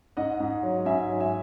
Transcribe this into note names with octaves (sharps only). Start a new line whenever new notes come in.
G#2 D#5 F#5
G#2
F#3
G#2 E5 G#5
F#3
E5 G#5